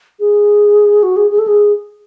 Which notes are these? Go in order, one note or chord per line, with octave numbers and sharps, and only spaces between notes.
G#4
F#4
G#4
G#4
A4
G#4